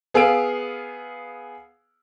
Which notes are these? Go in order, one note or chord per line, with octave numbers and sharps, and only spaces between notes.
B3 G#4 F5 E6 D7